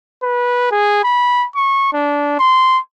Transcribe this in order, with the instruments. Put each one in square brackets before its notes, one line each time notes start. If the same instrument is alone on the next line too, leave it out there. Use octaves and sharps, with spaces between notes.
[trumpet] B4
G#4
B5
C#6
D4
C6